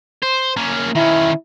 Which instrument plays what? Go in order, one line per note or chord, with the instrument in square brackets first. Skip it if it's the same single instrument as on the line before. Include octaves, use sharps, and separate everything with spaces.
[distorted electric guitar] C5
A#3 C#4
[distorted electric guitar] D#3 C#4 [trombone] E4